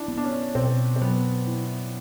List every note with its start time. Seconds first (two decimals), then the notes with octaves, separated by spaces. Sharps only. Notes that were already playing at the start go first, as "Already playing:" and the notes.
Already playing: D4 E4
0.08 B3
0.17 D4
0.24 C#4
0.55 B2 C4
0.96 C4
1.01 F#3 B3
1.47 E4